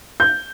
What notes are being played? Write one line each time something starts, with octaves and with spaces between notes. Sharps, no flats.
G6